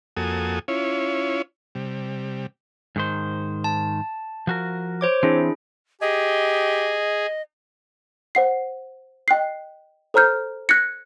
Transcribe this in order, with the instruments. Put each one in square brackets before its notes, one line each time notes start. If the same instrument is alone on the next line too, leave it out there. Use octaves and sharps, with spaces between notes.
[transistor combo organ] F2 A#3 F#4 A4 G#5 D#6
C#4 E4 F4 C#5
C3 G3
[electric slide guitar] G#2 D#3 C5
[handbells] A5
[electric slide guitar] F3 F#4 A#4
[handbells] C5 C#5 D6
[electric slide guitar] E3 C4 [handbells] D4 E4 G#4
[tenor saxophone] G4 [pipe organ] G#4 [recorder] D#5
[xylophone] C5 F#5 C7
D#5 G5 F#6 C7
A4 C5 A#5 F6 G6
F#6 G#6 A#6 C#7